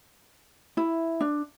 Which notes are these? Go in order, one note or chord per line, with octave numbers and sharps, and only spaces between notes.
E4
D4